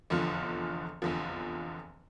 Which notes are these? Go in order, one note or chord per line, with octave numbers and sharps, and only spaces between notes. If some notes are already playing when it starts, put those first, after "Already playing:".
F1 E2 D3 F3
F1 E2 D3 F3